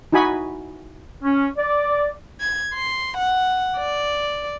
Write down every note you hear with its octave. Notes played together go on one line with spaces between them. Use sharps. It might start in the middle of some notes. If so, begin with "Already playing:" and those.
D#4 E4 F#4 G#5 B5 D#6
C#4
D5
G#6
C6
F#5
D5